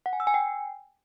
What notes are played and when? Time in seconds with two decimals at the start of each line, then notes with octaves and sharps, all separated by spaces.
0.06 F#5
0.13 G#5
0.20 E6
0.27 G#5
0.34 G5